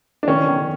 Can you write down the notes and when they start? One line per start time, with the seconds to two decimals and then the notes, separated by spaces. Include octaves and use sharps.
0.23 D4
0.27 D#3 C#4
0.48 D#3